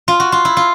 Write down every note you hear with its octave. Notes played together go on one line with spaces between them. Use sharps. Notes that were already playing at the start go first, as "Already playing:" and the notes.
F4
F#4
F4
E4
F4